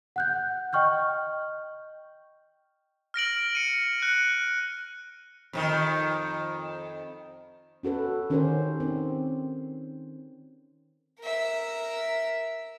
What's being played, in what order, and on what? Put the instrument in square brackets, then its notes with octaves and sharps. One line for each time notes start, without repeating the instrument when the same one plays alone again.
[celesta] F#5 F#6 G6
D#5 G5 C#6 F6 G6
[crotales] F6 A#6 D7 F#7
C#7 D#7
F#6 C#7
[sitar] F2 C3 D#3
[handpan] C#4 F#4 A4 B4
D#3 C#4 D#4 G4 A#4 C5
C4
[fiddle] A#4 E5